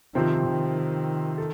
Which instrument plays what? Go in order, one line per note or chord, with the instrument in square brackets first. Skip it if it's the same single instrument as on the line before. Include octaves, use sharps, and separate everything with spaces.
[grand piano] C3 F3 C4 F4 C5 [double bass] D#3
[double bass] D#3
[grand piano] A4